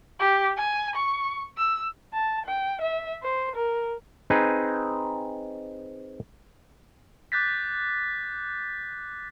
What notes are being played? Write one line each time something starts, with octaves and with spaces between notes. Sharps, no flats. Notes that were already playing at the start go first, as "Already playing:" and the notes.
G4
G#5
C#6
E6
A5
G5
E5
C5
A#4
C4 D#4 G#4 B4
D6 F#6 G6 A6 B6